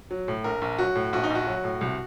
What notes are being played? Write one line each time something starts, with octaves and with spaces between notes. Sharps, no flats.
F#3
A2
A#1 A#4
A#1
F#3 F#4
A2
A#1 F#4
D#4
A#1
F#4
F#3
A2
C2